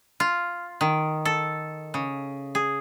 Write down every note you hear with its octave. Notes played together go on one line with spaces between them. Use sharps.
F4
D#3
A4
C#3
G#4